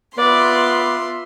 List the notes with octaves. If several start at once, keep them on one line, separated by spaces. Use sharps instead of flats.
B3 F4 D5 E5 C6